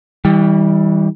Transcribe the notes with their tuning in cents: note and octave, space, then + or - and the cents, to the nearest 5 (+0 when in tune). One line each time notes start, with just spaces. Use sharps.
E3 -35 G3 +10